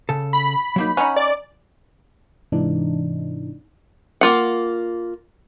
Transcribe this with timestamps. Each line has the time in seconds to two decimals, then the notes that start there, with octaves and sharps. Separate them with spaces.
0.09 C#3 A4
0.33 B5
0.76 F#3 A#3 D#4
0.97 C#4 D#4 F#5
1.16 D5
2.52 G#2 C3 E3 D4 D#4
4.21 A#3 F4 F#5